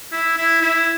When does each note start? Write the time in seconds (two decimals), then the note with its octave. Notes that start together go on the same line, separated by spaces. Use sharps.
0.12 E4
0.37 E4
0.62 E4